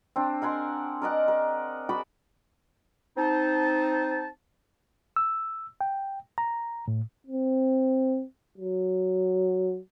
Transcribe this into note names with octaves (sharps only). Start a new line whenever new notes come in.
C4 D4
A#4 F#5 G#5 C6
A#4 D5 D#5 F#5
A#4
F#4 D5 G#5 B5
C4 D#4 A5
E6
G5
A#5
A2
C4
F#3